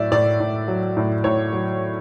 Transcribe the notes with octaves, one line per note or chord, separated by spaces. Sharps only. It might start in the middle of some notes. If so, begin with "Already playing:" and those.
Already playing: A2 F#3 D5 E5
A2 D5
A2
F#3
A2
A2 C#5
F#3